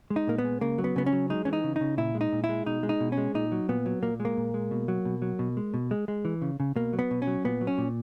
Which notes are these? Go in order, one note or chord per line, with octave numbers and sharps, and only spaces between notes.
G#3
D#4
A#2 A#3
B3
G#3
C#3 A#3
F#3
B3
C#3 B3
C#4
F#3
G#3 D#4
E3 C#4
D#4
C#3
D#4
C#3
A#2 E4
G#3
D#4
A#2
E4
G#3
B2 D#4
G#3
D#4
B2
C#4
G#3
A#2 D#4
F#3
A#2 B3
F#3
A#2 A#3
G#3
A#3
A#2
G#3
B2
F#3
B2
F#3
B2
G#3
B2
G#3
G#3
E3
C#3
C#3
B2 A#3
F#3
B3
B2
C#4
F#3
A#2 B3
F#3
C#4
A#2